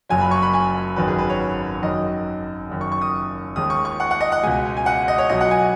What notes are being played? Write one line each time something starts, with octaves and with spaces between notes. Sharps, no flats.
F#1 F#2 F#3 G#5
B5
C#6
B5
G#5
G#1 F#2 D#3 F#3 B4
G#4
B4
C#5
F#2 D#3 F#3 D#5
F#1 F#2 D#3
C#6
C#6
D#6
D#2 D#3 G#3 D#6
C#6
C#6
F#5
F#5
D#5
F#5
C#2 B2 G#3 G#5
G#5
F#5
D#5
C#5
B1 B2 F#3 D#5
F#5
G#5